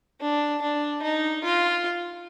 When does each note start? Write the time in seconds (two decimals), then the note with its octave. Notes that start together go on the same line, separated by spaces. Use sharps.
0.21 D4
0.61 D4
1.02 D#4
1.43 F4